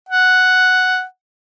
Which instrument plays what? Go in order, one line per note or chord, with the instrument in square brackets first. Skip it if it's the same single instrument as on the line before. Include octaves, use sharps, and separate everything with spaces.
[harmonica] F#5